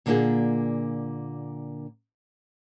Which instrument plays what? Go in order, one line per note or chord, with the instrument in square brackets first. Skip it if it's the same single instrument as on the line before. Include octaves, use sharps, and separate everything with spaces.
[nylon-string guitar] A#2 D3 A#3 D4 F4 G#4